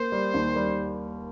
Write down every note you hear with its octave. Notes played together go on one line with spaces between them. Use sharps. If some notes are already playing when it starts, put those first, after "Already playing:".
Already playing: A#3 C5
G3
D#2
G3